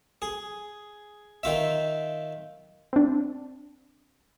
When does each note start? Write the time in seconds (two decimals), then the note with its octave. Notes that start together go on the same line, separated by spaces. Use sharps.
0.22 G#4
1.43 D#3 F4 E5
2.93 C4 D4